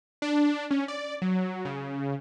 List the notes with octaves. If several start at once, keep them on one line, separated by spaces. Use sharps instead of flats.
D4
C#4
D5
F#3
C#3